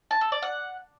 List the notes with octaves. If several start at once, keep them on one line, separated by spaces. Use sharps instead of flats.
A5
A4
D5
F#5